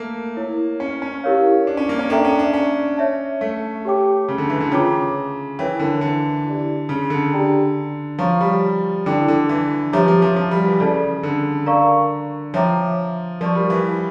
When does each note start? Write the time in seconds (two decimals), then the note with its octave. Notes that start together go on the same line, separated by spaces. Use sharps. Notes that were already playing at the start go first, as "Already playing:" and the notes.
Already playing: A3 A#3
0.36 E4 A#4 C#5
0.80 C#4
1.02 C#4
1.24 E4 G4 A#4 C#5 F5
1.67 D4
1.77 C#4
1.89 A#3
1.99 C#4
2.10 D4 A4 E5 G5 A#5
2.25 C#4
2.39 D4
2.53 C#4
2.97 C#5 E5 A5
3.41 A3
3.85 G4 C#5 G5 D6
4.28 C#3
4.38 D3
4.50 E3
4.60 D3
4.71 C#3 F4 C#5 G5 A#5 D6
5.59 E3 E4 A#4 C#5 G5
5.79 D3
6.01 D3
6.45 E4 G4 D5
6.89 C#3
7.10 D3
7.32 D4 G4 D5 G5 A#5
8.19 F3 C#5 F5 A#5 C#6
8.41 G3
9.06 D3 E4 A4 D5 G5 D6
9.28 D3
9.49 E3
9.93 F3 G4 C#5 E5 A#5 D6
10.08 F3
10.22 F3
10.36 F3
10.51 G3
10.65 E3
10.80 C#3 A4 D5 A5
11.23 D3
11.66 A#4 D5 F5 A#5 C#6
12.54 F3 C#5 E5 G5 A#5 D6
13.40 F3 A#4 D5 A5 C#6
13.55 G3
13.70 E3